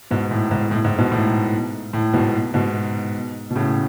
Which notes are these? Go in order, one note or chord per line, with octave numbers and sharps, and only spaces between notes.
G#2 B2
A2
G#2
A2
G#2
G#2 B2
A2
A2
G#2 B2
G#2 B2
B2
A2 C#3